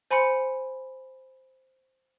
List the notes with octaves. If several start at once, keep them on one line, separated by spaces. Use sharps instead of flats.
C5 G#5 B5 C6 C#7